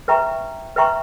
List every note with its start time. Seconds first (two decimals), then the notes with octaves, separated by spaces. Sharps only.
0.08 B4 E5 G5 A#5 C#6
0.76 B4 E5 G5 A#5 C#6